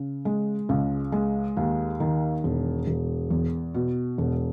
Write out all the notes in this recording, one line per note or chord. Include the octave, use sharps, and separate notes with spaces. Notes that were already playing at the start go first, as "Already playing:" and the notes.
Already playing: C#3
G#3
C#2
G#3
D#2
D#3
E1
E1
E2
B2
E1